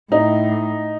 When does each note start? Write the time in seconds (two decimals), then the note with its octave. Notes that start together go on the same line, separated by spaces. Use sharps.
0.11 A2 D#4